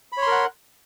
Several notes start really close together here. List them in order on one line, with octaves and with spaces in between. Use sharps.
B5 C#5 C6 A#4 F#5